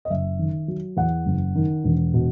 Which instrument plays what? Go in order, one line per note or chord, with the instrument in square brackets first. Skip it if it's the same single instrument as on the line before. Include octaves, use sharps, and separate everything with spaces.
[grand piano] D#5
F#1 E5
D#3
F#3
E2 F#5
F#1
D#3
E1
B2